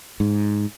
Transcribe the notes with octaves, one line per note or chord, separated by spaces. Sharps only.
G#2